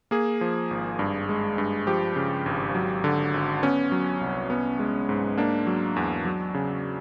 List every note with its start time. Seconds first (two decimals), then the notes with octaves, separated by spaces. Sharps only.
0.11 A#3 G#4
0.41 F3
0.71 G#1
0.99 G2
1.29 G#3
1.58 G2
1.87 F3 G4
2.16 C#3
2.46 G#1
2.75 F#3
3.04 D3
3.34 G#1
3.63 B3 C#4
3.92 F#3
4.21 C2
4.50 B3
4.79 G#3
5.09 G#2
5.38 A#3 D4
5.67 F#3
5.96 E2
6.25 F#3
6.54 C#3